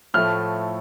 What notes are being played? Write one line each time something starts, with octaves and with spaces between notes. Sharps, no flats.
A2 F3 A3 F6